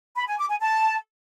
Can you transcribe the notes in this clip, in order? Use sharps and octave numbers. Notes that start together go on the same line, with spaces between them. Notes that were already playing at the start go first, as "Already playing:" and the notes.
B5
G#5
D6
G#5
A5